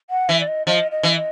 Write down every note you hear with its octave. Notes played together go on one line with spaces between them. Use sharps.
F#5
E3 E5
D5
D#5
F3 D#5
D#5
E3
D#5